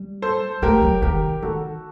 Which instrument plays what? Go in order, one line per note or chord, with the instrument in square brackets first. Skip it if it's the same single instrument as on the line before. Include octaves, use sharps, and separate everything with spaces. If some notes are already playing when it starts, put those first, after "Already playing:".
Already playing: [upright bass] G3
[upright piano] A4 C5
[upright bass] A3 [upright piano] G4 A#4
[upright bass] F#3
[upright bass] D#3 [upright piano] G4 A#4
[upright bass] D#3 [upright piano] F#4 A4